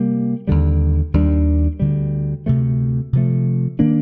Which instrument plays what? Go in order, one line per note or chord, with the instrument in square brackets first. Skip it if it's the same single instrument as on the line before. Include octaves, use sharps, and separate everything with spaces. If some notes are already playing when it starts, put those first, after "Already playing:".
Already playing: [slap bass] C3 G3 A#3
D#2 D3 G3
D#2 D#3 G3 D4
D2 D3 G3
D2 C3 F3 A3
C3 F3 A3
D#3 A#3 D4